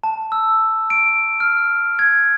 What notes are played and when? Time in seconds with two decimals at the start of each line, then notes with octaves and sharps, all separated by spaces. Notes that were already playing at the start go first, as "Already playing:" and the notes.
0.04 A5
0.32 E6
0.90 D7
1.40 F6
1.99 G#6